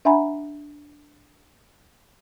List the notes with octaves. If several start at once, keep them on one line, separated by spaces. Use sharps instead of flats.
D4 E5 F#5 G#5 A#5 B5